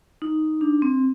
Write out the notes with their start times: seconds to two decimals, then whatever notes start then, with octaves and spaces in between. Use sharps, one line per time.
0.22 D#4
0.61 D4
0.82 C4